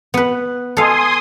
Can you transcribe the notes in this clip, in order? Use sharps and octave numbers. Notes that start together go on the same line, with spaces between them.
B3 B4
A4 F5 G#5 C6 D#6